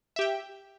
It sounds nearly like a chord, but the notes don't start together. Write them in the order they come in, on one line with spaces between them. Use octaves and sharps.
E5 G4 G5